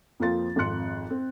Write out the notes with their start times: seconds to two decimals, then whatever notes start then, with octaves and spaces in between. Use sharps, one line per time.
0.20 F2 F3 A#3 C4 F4 A6
0.56 G#1 F2 F4 C6 F#6 C#7
1.10 C4